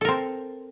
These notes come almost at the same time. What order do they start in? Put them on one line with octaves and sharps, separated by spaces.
A4 A#4 C4